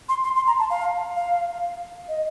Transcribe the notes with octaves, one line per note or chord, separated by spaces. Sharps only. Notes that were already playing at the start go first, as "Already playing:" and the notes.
C6
C6
C6
A#5
A5
F5
F5
D#5